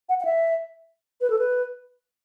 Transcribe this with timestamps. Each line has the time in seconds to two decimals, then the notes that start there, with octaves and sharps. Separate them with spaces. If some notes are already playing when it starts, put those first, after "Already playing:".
0.09 F#5
0.20 F#5
0.25 E5
1.21 B4
1.30 A4
1.39 B4